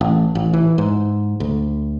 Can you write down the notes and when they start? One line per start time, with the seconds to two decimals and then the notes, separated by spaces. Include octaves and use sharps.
0.01 A1
0.35 A1
0.53 E3
0.78 G#2
1.40 D2